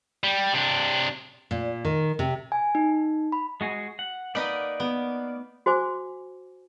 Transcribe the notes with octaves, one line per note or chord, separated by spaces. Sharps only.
G3
C3 D4
A#2
D#3
C3
G#5
D#4
B5
G#3 F#4 G#4
F#5
A#3 D#4 B4 D5 D#5 F#5
B3
F#4 C5 G#5 D6